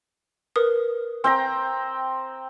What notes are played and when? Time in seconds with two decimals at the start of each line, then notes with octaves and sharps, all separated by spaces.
0.56 A#4 B4 D#6
1.24 C4 G5 A#5